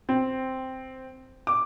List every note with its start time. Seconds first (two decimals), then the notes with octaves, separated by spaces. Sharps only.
0.09 C4
1.47 D6